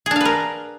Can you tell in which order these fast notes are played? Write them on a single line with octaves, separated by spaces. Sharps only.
G#4 D4 F5 B4 A#4